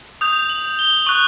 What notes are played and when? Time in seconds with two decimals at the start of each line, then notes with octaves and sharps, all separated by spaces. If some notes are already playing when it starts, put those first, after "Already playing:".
0.21 D#6 G6 F7
0.49 F#7
0.79 G7
1.07 C#6 F#6 F#7